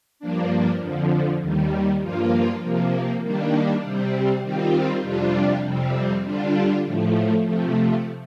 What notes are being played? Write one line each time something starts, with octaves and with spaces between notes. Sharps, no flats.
G2 F3 A#3 D4
F2 D3 F3
D#2 D#3 G3
G2 F3 A#3 F4
C3 F3 A#3
D#3 G3 A#3 D4
C3 G3 C4
D#3 G3 C4 F4
F2 C3 G3 D4 F4
F2 C3 G3 C4
D3 G3 D4 F4
A2 F3 A3
C3 F3 A3